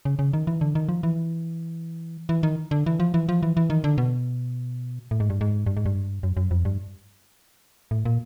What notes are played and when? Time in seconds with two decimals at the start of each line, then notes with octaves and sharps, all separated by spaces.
0.05 C#3
0.19 C#3
0.33 D#3
0.47 E3
0.61 D3
0.75 D#3
0.89 F3
1.03 E3
2.29 E3
2.43 D#3
2.71 D3
2.86 E3
3.00 F3
3.14 E3
3.29 F3
3.43 E3
3.57 E3
3.70 D#3
3.84 D3
3.98 B2
5.11 A2
5.20 G#2
5.30 G2
5.41 G#2
5.67 G2
5.77 G#2
5.86 G2
6.23 F#2
6.37 F#2
6.51 F2
6.65 G2
7.91 A2
8.05 A#2